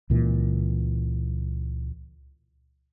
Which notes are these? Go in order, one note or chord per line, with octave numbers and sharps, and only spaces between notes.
C#2 A#2 E3